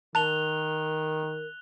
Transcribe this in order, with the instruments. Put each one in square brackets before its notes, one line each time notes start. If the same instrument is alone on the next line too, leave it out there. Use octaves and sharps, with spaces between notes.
[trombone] D#3 [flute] A#4 [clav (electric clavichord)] A5 [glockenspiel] F#6 F7 G7